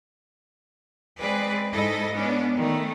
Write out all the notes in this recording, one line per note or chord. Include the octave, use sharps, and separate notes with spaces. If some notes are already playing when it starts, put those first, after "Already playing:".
G#3 C4 G#4 B4 D5
G#2 G#3 E4 A4 D#5
B3 C#4 D4
D#3 A3